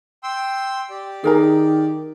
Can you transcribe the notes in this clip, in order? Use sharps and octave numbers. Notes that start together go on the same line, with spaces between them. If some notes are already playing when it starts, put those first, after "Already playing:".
G5 C6 E6
G4 D5
D#3 G#4 A#4 A#5